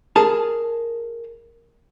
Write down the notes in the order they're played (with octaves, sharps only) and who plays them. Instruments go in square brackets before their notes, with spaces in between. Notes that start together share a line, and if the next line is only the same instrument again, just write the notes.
[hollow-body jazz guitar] G#4 A#4 A5